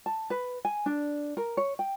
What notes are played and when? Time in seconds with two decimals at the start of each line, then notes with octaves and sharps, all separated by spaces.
0.06 A5
0.30 B4
0.65 G#5
0.86 D4
1.37 A#4
1.57 C#5
1.79 G5